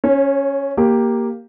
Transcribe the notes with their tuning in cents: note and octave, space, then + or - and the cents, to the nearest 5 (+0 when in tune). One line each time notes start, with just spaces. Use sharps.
C#4 +0 C#5 -35
A#3 +0 G4 +0